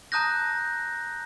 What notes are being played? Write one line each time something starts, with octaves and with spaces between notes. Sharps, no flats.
A5 A#5 D#6 F#6 G6 A#6